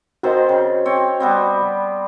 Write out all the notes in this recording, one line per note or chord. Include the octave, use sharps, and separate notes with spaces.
D#3 C4 F#4 C5 D#5
C#3
C4 C#5
G3 B3 C4